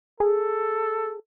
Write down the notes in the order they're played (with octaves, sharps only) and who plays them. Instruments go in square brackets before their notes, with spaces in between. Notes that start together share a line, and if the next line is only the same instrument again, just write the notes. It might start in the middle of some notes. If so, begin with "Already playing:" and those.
[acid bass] G#4 [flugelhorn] A4